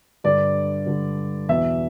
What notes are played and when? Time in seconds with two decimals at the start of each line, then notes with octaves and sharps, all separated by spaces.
0.24 G2 D3 D5
0.86 G2 D3
1.49 E2 B2 E5